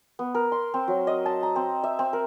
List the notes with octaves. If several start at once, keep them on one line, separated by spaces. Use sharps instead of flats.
B3
A#4
C6
C4
F#3
D#5
A5
A#5
C4
E5
C4
A#4